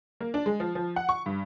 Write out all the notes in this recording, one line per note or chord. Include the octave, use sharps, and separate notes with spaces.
A#3
D4
G#3
F3
F3
F#5
C#6
G2